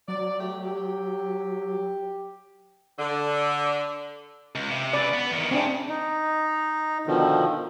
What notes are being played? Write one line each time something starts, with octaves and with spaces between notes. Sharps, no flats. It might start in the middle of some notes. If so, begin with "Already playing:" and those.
F#3 D5
A3 G4
G4
D3
C#2
C3
C#3 B4 D5
B3
E2 D#3
C#3 C4 D4
D#4
B2 D3 D#3 F3